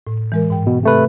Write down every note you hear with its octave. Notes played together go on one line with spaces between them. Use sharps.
A2
E3 G#3 A#4
G#2 G5
B2
C3 A3 B4